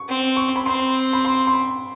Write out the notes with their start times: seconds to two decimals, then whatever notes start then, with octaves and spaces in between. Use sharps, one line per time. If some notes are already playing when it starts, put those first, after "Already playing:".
Already playing: C#6
0.08 C4
0.36 C#6
0.56 B5
0.66 C4 C6
1.13 B5
1.25 C6
1.47 C6
1.53 B5